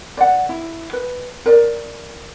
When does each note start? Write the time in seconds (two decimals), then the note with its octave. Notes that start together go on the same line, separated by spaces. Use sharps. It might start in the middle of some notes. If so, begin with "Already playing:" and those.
0.17 D5 F#5
0.49 E4
0.93 B4
1.46 A#4 D5